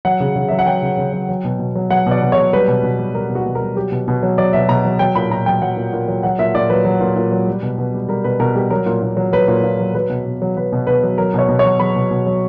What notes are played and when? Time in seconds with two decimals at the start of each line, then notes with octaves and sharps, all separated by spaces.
0.05 F#3 F#5
0.20 C#3
0.36 C#3
0.48 F#3 E5
0.59 F#5
0.67 F#3 G5
0.82 C#3
0.97 C#3
1.13 F#3
1.29 F#3
1.44 B2
1.59 B2
1.75 F#3
1.90 F#3 F#5
2.06 B2 D5
2.21 B2
2.32 C#5
2.37 F#3
2.53 G3 B4
2.68 B2
2.83 B2
2.99 G3
3.15 G3 A#4
3.30 B2
3.35 F#4
3.46 B2
3.55 A#4
3.61 G3
3.76 F#3 G4
3.92 B2
4.08 B2
4.23 F#3
4.38 F#3 D5
4.53 B2 E5
4.69 B2 A#5
4.85 F#3
4.99 F#3 G5
5.15 A#2 B5
5.30 A#2 A#5
5.46 F#3 G5
5.62 F#3 F#5
5.77 A#2
5.93 A#2
6.08 F#3
6.23 F#3 F#5
6.38 A#2 E5
6.55 A#2 D5
6.70 F#3 B4
6.85 F#3
7.01 A#2
7.16 A#2
7.32 F#3
7.48 G3
7.63 B2
7.78 B2
7.94 G3
8.09 G3 A#4
8.24 B2 B4
8.40 B2 A#4
8.55 G3 G4
8.71 F#3 A#4
8.86 A#2
9.02 A#2
9.17 F#3
9.33 F#3 B4
9.48 A#2
9.63 A#2
9.80 F#3
9.95 F#3 B4
10.10 B2
10.25 B2
10.42 F#3
10.57 F#3 B4
10.72 B2
10.87 B2 B4
11.03 F#3
11.18 F#3 A#4
11.34 B2 C#5
11.49 B2
11.59 C#5
11.65 F#3
11.80 F#3 B5
11.96 B2
12.11 B2
12.26 F#3